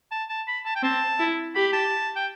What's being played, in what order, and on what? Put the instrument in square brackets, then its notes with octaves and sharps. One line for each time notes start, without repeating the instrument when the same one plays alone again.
[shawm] A5
A5
B5
A5
G5
[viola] C4 [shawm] A5
[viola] E4
[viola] G4 [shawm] B5
[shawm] A5
G5